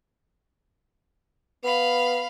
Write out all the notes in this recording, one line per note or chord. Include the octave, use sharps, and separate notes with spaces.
B3 F5 B5